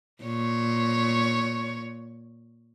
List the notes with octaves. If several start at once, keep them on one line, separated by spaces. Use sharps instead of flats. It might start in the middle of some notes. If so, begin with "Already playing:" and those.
A#2 C#5